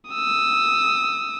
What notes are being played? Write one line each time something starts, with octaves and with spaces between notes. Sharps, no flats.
D#6 E6